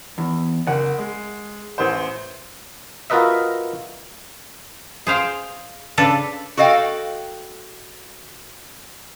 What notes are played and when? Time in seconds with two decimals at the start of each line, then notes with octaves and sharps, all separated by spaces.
0.18 E2
0.67 F#1 F#5
0.98 G#3
1.78 A1 E3 C5
3.10 F4 F#4 A#4 B4 D#5 E5
5.07 G#4 C5 F5 G5
5.97 C#3 D4 A4 B4
6.57 F#4 A4 D#5 F5 G5